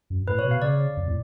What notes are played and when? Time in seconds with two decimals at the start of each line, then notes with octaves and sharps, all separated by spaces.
0.10 F#2
0.28 A2 B4
0.39 C#5
0.45 B2
0.51 F5
0.62 C#3 D5
0.97 F2
1.08 A2